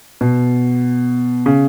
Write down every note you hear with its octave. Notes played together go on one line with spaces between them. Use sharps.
B2
C#3